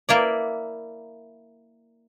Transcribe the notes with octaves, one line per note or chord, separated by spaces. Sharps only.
A#3 E4 D5